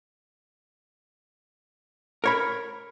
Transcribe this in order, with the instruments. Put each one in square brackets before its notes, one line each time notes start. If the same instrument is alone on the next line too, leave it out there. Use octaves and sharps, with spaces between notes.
[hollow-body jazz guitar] A#4 C#5 B5